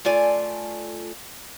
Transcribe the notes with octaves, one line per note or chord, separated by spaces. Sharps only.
A3 F4 D5 G#5